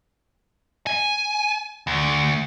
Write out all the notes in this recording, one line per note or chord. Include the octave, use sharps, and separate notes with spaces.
G#5
D2